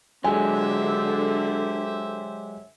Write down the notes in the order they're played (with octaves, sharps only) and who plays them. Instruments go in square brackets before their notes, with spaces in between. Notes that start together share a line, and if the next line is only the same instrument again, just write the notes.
[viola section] D3 [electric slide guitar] F#3 G#3 [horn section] G4 C5 E5 [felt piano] G#5